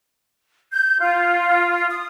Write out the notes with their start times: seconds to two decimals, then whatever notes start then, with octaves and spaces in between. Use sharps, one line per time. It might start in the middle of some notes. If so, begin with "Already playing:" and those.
0.71 G6
0.99 F4
1.89 D#6